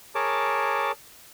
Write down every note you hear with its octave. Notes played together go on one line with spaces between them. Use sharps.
G#4 A#4 C#5 A5 D6